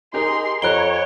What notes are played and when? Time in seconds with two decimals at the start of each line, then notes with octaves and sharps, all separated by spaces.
0.14 D#4 G4 G#4 A#4 C6
0.62 F2 C#5 A#5 B5 F#6 D7 G7